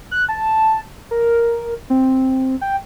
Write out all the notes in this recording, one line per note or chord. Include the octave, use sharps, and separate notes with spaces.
F#6
A5
A#4
C4
G5